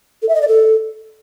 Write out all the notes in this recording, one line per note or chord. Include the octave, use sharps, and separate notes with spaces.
A4
E5
D#5
D5
A4